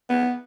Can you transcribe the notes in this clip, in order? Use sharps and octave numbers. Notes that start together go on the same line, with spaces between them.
B3